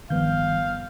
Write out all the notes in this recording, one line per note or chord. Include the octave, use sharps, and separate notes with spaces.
G1 D#3 F3 G3 B3 F5 G6